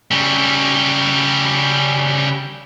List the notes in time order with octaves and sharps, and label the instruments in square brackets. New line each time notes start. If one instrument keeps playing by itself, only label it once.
[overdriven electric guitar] C#3 G3